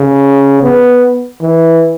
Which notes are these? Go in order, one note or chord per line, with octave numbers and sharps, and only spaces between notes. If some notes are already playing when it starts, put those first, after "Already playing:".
Already playing: C#3
B3
E3